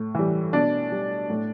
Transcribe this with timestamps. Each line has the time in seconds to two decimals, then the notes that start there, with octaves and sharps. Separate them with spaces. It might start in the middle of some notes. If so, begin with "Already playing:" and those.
Already playing: A2
0.15 E3 G3
0.53 B2 D4
0.92 G3
1.30 A2